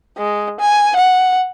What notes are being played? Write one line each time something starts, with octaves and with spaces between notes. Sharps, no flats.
G#3
G#5
F#5